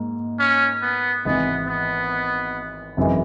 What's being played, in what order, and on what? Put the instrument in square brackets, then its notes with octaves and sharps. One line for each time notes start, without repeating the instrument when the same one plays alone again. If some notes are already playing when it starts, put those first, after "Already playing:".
Already playing: [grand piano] G#2 A#3
[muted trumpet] C#4
B3
[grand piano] G#1 G#2 E3 [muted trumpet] B3
[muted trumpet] B3
[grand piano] G#1 F#2 E3 G#3